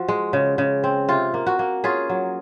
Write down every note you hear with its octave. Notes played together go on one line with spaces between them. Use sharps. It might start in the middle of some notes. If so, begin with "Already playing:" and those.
Already playing: F3 F#4
G#3
C#3
C#3
C4
C3 F4
A#3
F#4
A#3
C#4 F4 G#4
F#3